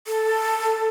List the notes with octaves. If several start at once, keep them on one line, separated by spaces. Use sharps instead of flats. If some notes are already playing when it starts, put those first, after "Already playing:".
A4